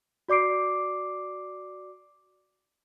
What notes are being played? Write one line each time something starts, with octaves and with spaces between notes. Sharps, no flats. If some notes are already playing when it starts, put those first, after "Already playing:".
F#4 D5 D6 C7 D7